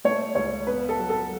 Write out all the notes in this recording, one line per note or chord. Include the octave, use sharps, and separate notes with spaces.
A3 C#5
C#2 C#5
B3 B4
A4
F#3
A4